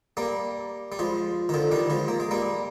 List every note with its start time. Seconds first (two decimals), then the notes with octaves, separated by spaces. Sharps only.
0.17 G3 A#3
0.92 G3
0.99 F3 G#3
1.49 D#3
1.54 D3 F3
1.71 D#3 G3
1.90 F3 G#3
2.08 A#3
2.20 G#3
2.31 G3 A#3